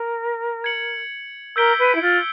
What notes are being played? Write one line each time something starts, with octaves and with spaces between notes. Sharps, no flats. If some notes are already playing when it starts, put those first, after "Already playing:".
Already playing: A#4
G#6 C#7 F#7
A#4 E6 G6 B6 D7 G7
B4
E4
F4